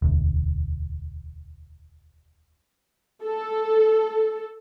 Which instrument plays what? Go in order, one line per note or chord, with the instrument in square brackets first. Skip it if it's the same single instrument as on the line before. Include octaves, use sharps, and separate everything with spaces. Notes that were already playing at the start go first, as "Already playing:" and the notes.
[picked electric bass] E1 D2
[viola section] A4